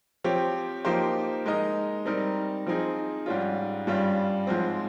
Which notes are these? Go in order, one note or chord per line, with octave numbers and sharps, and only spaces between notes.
F3 C4 G4 C#5
F3 A#3 D#4 G4 C5
G#3 D#4 A#4 D#5
G3 C4 D#4 A#4
F3 C4 D#4 G#4
G#2 G3 C#4 F4
G2 G3 C#4 F4
G#2 F3 G#3 C4